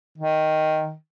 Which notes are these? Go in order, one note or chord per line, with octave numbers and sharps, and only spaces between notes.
D#3